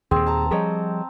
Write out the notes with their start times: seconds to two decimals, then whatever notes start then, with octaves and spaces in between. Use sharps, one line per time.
0.11 D#2 A#2 C4 G#4
0.26 A5 A#5
0.51 F3 G3 G#4 C#5 D#5